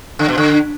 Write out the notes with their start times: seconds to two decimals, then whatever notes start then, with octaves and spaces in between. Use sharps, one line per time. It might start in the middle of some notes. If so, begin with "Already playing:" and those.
0.19 D3
0.28 B2
0.38 D3